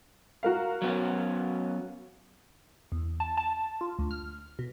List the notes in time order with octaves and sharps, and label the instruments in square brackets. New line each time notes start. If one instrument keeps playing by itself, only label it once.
[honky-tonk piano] F#4 A#4 F5
[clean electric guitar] F#3 B3 C#4
[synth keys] E2
A5
A5
F4
D2
F6
B2